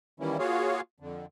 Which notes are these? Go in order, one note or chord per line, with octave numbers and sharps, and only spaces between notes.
D#3 E3 G3 A#3 C#4 E4
A#3 F4 F#4 G#4 C#5 F5
F2 D3